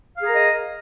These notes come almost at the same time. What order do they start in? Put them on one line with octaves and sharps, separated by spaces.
F5 G#4 A#5 A#4 D#5